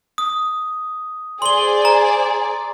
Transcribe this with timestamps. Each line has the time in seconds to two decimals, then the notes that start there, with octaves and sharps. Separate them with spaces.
0.18 D#6
1.42 G#4 C5 D5 C6 G7
1.85 A#5